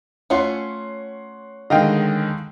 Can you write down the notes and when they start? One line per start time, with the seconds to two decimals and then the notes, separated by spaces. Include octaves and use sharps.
0.30 A3 C#4 F4 C#5 F#5 C6
1.70 D3 D#3 G#3 D#5 F5 G5